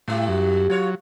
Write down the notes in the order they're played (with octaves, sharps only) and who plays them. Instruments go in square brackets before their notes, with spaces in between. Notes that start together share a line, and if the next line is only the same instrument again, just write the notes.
[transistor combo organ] A2 [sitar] G3 E4 G4
[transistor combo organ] F#2
[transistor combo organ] F#3 [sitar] F4 C#5